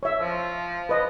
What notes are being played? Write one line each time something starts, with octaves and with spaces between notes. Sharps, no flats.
C#5 E5
F3
B4 D#5